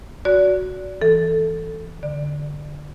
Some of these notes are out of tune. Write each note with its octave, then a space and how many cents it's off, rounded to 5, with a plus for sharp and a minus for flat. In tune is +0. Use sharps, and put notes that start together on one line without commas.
F#4 +0 D5 -25
E3 +0 A4 +0
D3 +0 D5 +25